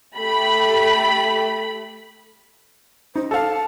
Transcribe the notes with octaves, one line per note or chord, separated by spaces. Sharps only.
A3 G4 B5
D#4 C5
A4 F5 A5